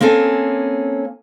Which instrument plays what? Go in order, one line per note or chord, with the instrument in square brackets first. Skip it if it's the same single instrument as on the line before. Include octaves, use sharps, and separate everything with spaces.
[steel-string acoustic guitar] A#3 C4 C#4 A4 G#5